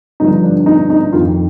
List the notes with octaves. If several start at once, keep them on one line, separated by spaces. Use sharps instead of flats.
G2 D3 F3 D#4
D4
D#4
D#4
F2 D#3 F4